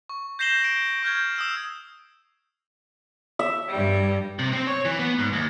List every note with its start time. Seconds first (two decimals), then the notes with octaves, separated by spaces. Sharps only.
0.10 C#6
0.39 G6 A#6 C7 E7 F#7 G7
0.64 D7
1.03 C#6 F6 G6 G#6
1.36 D#6 E6 E7
3.39 E5
3.69 G2 G3
4.39 C3
4.53 C4
4.67 C#5
4.85 E3
4.99 B3
5.19 G#2
5.33 D#2